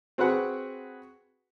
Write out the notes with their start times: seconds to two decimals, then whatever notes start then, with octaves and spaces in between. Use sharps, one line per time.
0.18 C4 F#4 G#4 B4 F#5